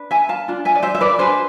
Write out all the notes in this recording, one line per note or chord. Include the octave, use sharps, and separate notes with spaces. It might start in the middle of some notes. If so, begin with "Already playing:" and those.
Already playing: D4 B4
E5 G#5
F5 A5
D4 F4
E5 G#5
D5
C5 E5
E5
B4 D5
D4 G#4 B4 C5